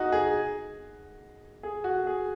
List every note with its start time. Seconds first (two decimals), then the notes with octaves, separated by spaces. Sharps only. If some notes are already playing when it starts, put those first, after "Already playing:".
Already playing: D#4 F#4 G#4
0.12 G#4
1.63 G#4
1.84 F#4
2.07 G#4